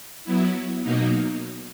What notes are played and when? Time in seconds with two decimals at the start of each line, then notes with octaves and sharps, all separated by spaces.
0.25 F#3 B3 E4
0.82 B2 F#3 A#3 D#4